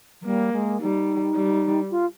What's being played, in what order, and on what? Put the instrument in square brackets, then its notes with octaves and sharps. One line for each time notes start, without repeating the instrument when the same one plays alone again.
[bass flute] F3
[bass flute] G3 [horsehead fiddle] A#3
[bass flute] G#3
[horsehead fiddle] G3 [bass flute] D#4
[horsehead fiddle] G3
[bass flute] F4